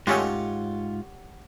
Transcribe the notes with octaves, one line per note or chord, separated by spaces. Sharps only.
G#2 G#3 A3 C#4 F4 G4 C#5 F#5